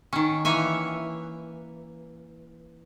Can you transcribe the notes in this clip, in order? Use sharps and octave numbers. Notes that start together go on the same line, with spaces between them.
D#3 C#4
E3 A#3 C#5 E5 G#5